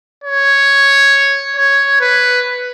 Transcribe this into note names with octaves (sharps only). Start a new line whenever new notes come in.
C#5
C#5
B4